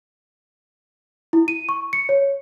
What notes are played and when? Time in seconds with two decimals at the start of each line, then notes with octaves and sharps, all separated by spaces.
1.33 E4
1.48 D#7
1.69 C#6
1.93 C#7
2.09 C#5